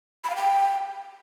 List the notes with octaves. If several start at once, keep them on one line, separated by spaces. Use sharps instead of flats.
B5
F5
G5